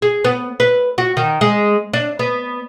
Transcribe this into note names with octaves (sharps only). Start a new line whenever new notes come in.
G#4
B3
B4
F#4
D#3
G#3
D4
B3